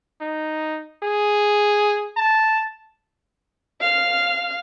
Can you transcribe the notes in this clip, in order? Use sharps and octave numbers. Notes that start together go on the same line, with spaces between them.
D#4
G#4
A5
F5 F6